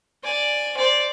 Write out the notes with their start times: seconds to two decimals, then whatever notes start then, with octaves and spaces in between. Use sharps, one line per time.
0.24 D5 G#5
0.77 C5 D5